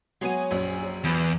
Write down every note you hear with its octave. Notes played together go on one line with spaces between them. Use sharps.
F#3 G#3 B3 G#4 C#5 D#7
A#1 F#2
E2 E3